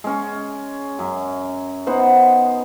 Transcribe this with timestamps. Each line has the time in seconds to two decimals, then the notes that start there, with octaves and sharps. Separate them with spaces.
0.04 G#3 C#4
0.99 F#2
1.87 B3 D#4 C5 F#5